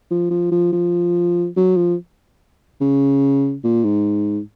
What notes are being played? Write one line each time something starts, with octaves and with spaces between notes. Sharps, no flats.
F3
F3
F3
F3
F#3
F3
C#3
A#2
G#2